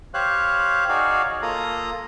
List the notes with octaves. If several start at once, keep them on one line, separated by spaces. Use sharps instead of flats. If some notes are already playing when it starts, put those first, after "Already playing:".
G4 C5 C#5 F5 F#6
D#4 F#4 G#4 C#5 D5 F5
A#3 F4 A4 A#5 D#6